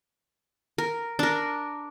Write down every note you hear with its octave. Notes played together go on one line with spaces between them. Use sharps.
A#4
D4 A#4